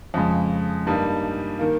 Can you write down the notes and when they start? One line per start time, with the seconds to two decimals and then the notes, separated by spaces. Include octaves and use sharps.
0.14 F2 C#3 G#3
0.87 G2 G3 A#3 D#4
1.59 D#3 A#3